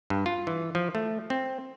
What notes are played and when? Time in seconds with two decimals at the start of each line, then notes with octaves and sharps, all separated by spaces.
0.10 G2
0.26 F4
0.47 E3
0.75 F3
0.95 A3
1.30 C4